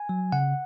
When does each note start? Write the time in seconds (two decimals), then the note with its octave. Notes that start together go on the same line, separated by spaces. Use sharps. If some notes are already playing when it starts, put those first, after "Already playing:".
Already playing: G#5
0.09 F#3
0.32 C#3 F#5